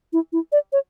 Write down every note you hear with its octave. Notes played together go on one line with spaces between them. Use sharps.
E4
E4
D5
C#5